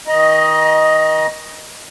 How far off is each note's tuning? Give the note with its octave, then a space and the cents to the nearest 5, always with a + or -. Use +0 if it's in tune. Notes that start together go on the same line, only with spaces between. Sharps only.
D#3 +30 D#5 +0 A#5 +30